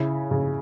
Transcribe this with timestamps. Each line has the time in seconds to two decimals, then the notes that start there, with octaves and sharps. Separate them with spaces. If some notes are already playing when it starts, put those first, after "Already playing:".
Already playing: C#3 E4
0.31 C#3